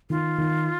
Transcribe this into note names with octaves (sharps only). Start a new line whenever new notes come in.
D#3 F4
D#3